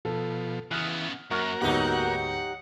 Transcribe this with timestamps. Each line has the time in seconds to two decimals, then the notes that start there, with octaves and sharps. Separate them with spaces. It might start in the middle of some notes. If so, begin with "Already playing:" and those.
0.05 B2 F3 A4
0.71 C#3 E3 B3 D#6 F6 F#6
1.31 F#2 A#3 F#4 A#4 C#6 F6 F#6
1.62 D2 G#2 F#3 B3 D#4 G4 F#5